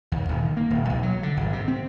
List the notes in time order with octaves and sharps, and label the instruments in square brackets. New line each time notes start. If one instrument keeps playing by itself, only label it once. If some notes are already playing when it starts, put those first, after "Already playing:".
[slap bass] D#2
D#1
D#3
A#3
D#1
B1
F#3
D3
G#1
C3
C4